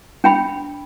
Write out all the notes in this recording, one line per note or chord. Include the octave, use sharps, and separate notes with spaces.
D4 G5 B5